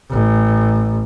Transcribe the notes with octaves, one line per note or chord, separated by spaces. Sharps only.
A1